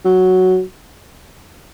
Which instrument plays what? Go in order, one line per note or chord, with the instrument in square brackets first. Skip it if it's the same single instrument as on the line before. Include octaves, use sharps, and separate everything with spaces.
[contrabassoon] F#3